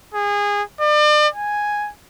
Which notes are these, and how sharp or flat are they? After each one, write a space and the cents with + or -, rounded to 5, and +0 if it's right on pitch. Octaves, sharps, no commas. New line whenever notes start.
G#4 -25
D5 +40
G#5 +0